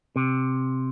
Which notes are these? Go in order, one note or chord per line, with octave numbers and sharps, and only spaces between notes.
C3